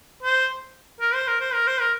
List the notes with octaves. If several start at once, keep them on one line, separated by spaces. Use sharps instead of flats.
C5
A#4
C5
A#4
C5
A#4
C5
A#4